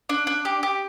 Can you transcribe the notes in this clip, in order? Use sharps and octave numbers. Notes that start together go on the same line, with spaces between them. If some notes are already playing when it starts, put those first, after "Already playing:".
D4
D4
G4
G4